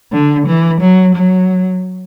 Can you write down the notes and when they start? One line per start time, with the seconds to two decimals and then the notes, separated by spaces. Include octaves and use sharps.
0.12 D3
0.47 E3
0.81 F#3
1.15 F#3